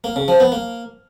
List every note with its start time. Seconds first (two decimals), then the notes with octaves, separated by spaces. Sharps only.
0.04 A#3
0.16 C#3
0.28 F3
0.40 B3
0.52 A#3